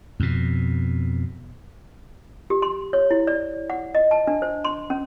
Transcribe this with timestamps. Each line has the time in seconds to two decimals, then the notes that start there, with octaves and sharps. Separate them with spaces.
0.20 F2 B2
2.50 G4
2.62 C6
2.93 C#5
3.11 E4
3.27 D5
3.70 F#5
3.95 D#5
4.11 A5
4.27 D4
4.42 C5
4.65 C6
4.90 C#4